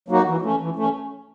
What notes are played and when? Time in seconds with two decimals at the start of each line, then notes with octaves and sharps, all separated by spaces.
0.08 F#3 A#3 D#4 F#4
0.26 E3
0.42 A3 C#4
0.60 E3
0.76 A3 C#4